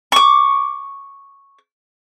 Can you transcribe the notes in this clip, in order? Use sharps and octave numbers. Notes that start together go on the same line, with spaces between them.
C#6 D6